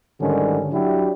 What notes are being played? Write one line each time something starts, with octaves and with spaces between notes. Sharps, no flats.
G#2 D3 D#3 G3 C#4
F#3 D4 E4 F#4 G4